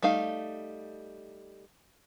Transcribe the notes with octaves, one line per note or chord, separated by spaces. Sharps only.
G3 A3 D#4 F5